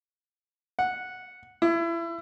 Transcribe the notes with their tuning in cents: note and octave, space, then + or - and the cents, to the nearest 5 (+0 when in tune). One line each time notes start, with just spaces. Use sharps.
F#5 -5
E4 +30